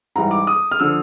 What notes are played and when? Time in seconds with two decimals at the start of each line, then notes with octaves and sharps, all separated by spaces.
0.15 G#2 E3 G3 A#5
0.31 D6
0.47 D#6
0.71 F6
0.80 D3 F3 E6